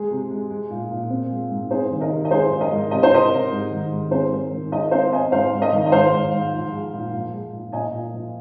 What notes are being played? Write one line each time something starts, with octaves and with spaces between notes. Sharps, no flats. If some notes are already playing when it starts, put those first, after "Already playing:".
Already playing: G#3 G#4
C3
G#3
G#3
A#2
A#2
C4
G#3
G#2
C4 G#4 C5
D#3
A#4 D#5
C3
D#5
G#3 G#4 C5
F3
A#4 D#5
G#2
C3 D#5
C5
C3 A#4 D#5
C3
G#2
D#3
G#2
C4 G#4 C5
G#2 A#4
D#3
G#3 A#4 D#5
C4 C5 F5
C4 D#5 G#5
G#2 C5 F5
G#2
A#4 D#5
D#3
D#5
G#2 C5 F5
G#2
G#2
F3
G#3
A#2
F3
G#3
A#2
A#2 D#5 G#5
A#2
F3